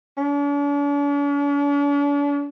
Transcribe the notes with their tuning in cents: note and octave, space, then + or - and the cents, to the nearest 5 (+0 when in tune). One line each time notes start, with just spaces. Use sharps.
D4 -45